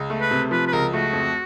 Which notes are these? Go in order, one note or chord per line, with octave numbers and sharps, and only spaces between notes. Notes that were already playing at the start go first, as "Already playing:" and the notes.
Already playing: C#2
A3
B4
C3
F3 B4
B4
C#2 A#4
A3 F#4
F2